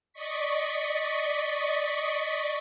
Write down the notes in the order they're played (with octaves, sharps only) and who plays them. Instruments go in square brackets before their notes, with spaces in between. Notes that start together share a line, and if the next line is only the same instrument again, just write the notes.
[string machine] D5 D#5 C#6 B6